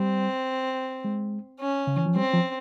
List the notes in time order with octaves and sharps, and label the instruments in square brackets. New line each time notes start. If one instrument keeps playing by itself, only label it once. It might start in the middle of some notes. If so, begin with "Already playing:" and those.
Already playing: [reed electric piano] G3 [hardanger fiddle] C4
[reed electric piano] G#3
[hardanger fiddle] C#4
[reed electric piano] C#3
E3
F3
[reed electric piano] G3 [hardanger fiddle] C4
[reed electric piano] F3